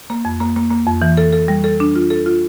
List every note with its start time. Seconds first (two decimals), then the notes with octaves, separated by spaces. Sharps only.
0.10 A#3
0.25 F2
0.40 A#3
0.56 A#3
0.71 A#3
0.87 F2
1.02 E3
1.17 A4
1.33 A4
1.48 G3
1.64 A4
1.80 D4
1.95 F4
2.10 A4
2.26 F4